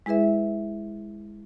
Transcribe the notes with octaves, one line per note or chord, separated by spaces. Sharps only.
G#3 E4 G#4 B4 E5